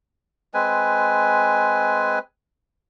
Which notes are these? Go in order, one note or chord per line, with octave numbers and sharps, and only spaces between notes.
G#3 C4 B4 G#5